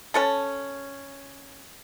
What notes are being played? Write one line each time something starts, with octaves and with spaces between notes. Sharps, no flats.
C#4 A4 A5